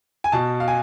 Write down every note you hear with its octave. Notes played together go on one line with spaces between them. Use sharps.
G#5
B2 A5
F5
G#5